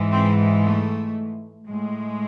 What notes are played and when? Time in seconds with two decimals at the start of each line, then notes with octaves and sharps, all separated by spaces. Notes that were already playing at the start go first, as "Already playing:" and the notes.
Already playing: G#2 E3 G#3
0.11 C4
0.64 A3
1.68 A2 G#3